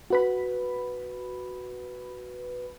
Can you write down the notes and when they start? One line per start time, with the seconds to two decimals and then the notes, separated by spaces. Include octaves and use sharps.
0.10 F#4 B4 B5